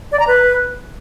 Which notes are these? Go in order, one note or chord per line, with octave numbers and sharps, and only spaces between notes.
D5
A#5
B4